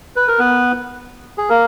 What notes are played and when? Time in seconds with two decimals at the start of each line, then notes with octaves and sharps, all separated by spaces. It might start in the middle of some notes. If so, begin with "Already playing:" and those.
0.16 B4
0.28 A#4
0.39 B3 B4
1.38 G#4
1.49 A#3 A#4